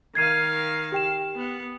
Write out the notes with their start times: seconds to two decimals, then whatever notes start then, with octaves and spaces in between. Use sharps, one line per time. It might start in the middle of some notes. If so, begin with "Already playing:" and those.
0.15 D#3 F5 G#6 C7 D#7
0.92 G4 G5 E7
1.35 B3 F#5